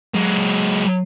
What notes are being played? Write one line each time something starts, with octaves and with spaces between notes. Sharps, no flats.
F#3 G#3